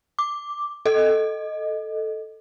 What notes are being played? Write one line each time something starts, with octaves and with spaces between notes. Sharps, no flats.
D6
A4 D#5